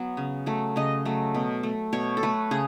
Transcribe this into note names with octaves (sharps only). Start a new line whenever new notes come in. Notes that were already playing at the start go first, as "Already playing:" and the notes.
Already playing: F#3 B3
C#3
F#3 A3
C#3 D#5
F#3 A3
B2
A3
B2 C#5
A4
A3 B4
C#3 G#4